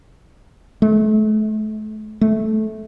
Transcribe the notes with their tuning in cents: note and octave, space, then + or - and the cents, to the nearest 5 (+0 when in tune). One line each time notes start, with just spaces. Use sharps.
A3 -35
A3 -15